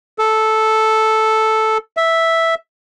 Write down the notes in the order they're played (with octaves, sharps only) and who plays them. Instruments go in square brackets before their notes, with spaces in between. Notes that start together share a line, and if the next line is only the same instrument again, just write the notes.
[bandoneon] A4
E5